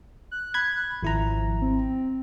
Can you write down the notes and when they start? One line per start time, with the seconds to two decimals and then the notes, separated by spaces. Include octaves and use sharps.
0.31 F#6
0.54 B5 G#6
1.03 G#1 F3 E4 A#5
1.62 C4